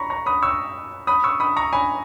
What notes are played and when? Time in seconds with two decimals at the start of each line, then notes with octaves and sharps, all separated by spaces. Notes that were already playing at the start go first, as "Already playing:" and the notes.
Already playing: A#5 B5 C#6
0.10 A#5 C#6
0.26 B5 D#6
0.42 C#6 E6
1.07 B5 D#6
1.24 C#6 E6
1.40 B5 D#6
1.57 A#5 C#6
1.73 G#5 B5